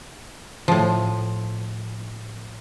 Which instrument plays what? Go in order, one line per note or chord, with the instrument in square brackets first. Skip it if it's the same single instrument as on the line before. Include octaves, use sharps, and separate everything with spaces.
[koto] A2 F3